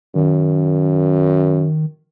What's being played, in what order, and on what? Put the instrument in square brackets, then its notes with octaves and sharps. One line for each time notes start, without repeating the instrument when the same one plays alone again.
[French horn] F#2 [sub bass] D#3